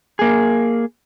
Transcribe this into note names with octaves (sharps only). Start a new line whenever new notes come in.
A#3 G#4